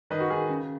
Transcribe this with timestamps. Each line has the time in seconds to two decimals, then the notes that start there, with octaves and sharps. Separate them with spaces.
0.10 D#3 B4 D#5
0.20 F#4
0.30 D#3 G#4
0.49 C#3